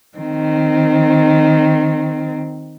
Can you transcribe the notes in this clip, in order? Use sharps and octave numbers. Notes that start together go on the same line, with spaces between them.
D#3 C4